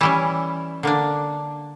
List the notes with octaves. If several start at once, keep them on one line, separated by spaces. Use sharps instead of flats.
E3 G3 C#4 E4
D3 A#3 D4